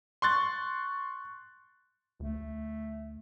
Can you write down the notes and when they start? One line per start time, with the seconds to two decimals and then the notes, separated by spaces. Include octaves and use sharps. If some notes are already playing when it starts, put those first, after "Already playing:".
0.22 C6 C#6 F#6 A6
2.20 D2 A3